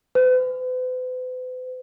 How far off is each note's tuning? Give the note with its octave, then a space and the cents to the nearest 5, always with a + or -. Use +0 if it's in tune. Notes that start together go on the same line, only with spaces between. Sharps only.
B4 +45